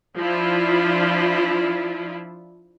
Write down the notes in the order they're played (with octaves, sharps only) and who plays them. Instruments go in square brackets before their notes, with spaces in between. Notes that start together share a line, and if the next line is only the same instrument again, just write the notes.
[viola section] F3 D4 E4 F4